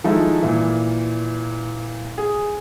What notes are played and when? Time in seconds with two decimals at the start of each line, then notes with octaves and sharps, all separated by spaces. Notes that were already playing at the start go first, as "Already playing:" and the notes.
0.04 D#3 F3 G#3 D#4 E4 A4
0.42 A#2 E3
2.18 G#4